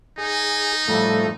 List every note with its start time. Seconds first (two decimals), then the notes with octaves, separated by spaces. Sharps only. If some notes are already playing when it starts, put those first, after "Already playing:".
0.18 D#4 G#4
0.88 A2 F3 G3 A3